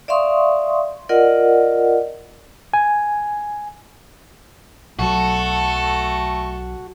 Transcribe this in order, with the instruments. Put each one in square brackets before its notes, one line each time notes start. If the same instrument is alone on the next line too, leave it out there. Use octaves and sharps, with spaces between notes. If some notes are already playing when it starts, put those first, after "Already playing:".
[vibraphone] D5 E5 F5 C6 C#6 D#6
F4 A#4 D5 D#5 F#5
[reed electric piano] G#5
[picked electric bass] B1 F#3 [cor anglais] A3 [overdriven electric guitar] F#4 [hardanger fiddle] A4